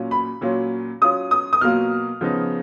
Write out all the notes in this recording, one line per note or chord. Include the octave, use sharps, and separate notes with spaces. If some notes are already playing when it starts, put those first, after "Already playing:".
Already playing: A#2 F#3 C#4 F4
B5
A#2 F#3 C#4 F4
F#3 C#4 F4 D#6
D#6
D#6
B2 F#3 A#3 F4 F6
C#3 F3 B3 D#4